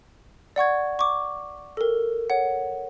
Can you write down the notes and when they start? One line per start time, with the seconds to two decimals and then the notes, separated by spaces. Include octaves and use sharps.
0.56 D5 F#5 C#6 G#6
0.99 C#6 D6
1.77 A4 A#4
2.30 C#5 F#5